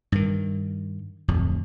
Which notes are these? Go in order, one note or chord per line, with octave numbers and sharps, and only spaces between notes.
G2 D#3
D1 F2